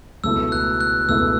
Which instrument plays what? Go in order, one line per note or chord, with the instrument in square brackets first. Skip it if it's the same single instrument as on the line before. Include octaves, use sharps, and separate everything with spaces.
[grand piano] C#2 B2 A3 E4 [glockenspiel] E6
[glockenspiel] F#6
F#6
[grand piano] C#2 B2 A3 E4 [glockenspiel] E6